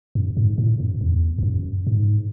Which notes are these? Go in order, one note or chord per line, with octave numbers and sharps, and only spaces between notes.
F#2
G#2
A2
F#2
E2
E2
F#2
G#2